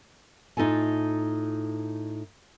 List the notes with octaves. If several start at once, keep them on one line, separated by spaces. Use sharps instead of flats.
A2 D#4 F4 A4 G#5